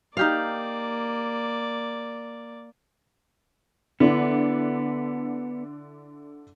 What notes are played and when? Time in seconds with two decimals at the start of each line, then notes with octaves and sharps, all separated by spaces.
0.17 A#3 D#4 G4 D5 F5
4.00 D3 B3 D4 E4